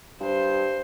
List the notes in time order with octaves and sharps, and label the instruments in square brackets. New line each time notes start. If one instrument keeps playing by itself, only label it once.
[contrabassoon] G2 [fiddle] C5